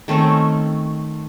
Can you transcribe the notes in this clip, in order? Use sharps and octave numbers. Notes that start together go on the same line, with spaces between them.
D#3 A3 C4 C#4